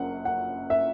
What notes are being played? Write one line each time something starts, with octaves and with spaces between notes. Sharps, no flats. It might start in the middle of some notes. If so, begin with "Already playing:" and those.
Already playing: F#1 F#2 F#5
F#5
E5